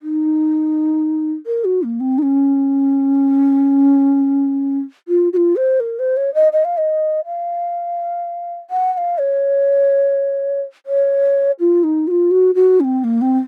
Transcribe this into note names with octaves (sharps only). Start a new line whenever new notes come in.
D#4
A#4
F#4
A#3
C4
D#4
C#4
F4
F#4
F4
C5
A#4
C5
C#5
D#5
D#5
F5
D#5
F5
F#5
F#5
F5
C#5
C#5
F4
D#4
F#4
F4
F#4
F#4
C#4
C4
A#3
C4